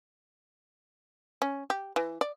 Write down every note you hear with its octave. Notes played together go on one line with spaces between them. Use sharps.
C#4
G4
E3
D5